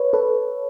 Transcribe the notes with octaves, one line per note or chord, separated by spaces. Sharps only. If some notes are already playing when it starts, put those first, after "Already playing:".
Already playing: B4 C#5
A4 B4